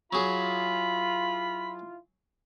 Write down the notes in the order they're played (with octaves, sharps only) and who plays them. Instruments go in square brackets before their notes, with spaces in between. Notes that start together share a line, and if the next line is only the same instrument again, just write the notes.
[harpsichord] F#3 G#4 [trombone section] E4 F4 [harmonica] B5